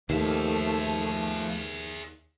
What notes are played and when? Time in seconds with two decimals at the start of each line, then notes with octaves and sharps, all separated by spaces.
0.10 D#2 F3 A3 G#4 E5